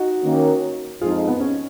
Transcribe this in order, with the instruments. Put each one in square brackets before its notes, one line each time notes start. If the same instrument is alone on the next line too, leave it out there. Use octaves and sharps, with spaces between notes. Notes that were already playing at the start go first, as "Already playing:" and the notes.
Already playing: [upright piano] D#4 F#4
[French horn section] D#3 A#3 C#4
[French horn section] F2 F3 G#3 D#4 [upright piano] F4 G#4
[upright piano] B3
C#4